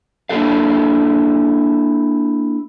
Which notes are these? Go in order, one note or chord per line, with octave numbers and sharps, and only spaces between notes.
A#3 D4 E4 F4 A4 F5